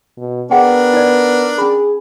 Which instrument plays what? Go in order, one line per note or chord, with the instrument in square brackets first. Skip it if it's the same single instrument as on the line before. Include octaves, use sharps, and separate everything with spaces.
[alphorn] B2
[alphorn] B3 [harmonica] D4 A#4 [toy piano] G#4 F#5 G5
[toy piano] D#4 D5
[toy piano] C#4 B5 [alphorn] G#4